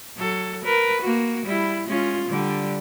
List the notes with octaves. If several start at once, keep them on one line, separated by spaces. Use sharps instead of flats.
F#3 A4
A#4 B4
A#3 F#4
G3 E4
G#3 C#4 F4
D3 G3